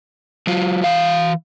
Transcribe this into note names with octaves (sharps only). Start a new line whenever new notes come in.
F#3 F4
E3 F5